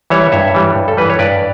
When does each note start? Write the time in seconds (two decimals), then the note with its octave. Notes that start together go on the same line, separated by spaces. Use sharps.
0.10 E3 G3 C#5 E5
0.32 G2 C#5 E5
0.54 E3 G3
0.75 G2
0.88 A4
0.97 E3 G3 B4
1.10 C#5
1.19 G2 B4 D5